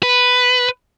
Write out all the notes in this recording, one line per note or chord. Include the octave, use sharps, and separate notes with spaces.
B4